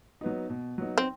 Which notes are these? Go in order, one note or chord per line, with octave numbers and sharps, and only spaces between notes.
F#3 B3 D#4
B2
F#3 B3 D#4
C4